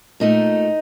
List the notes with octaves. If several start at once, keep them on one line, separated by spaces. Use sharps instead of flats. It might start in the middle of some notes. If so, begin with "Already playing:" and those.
A#2 A3 D#4